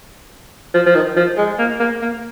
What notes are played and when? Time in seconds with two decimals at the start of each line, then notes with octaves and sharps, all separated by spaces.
0.74 F3
0.86 F3
0.95 D#3
1.17 F3
1.37 G#3
1.59 A#3
1.80 A#3
2.01 A#3